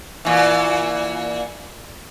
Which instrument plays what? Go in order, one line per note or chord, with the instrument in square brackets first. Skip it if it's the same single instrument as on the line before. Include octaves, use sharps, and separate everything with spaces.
[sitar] A#2 E3